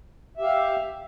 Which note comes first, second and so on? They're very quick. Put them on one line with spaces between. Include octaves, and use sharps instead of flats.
E5 G4 F5